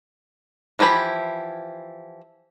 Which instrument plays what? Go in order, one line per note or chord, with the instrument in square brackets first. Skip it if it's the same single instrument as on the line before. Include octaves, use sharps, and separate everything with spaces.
[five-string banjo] E3 F3 E4 G4 B5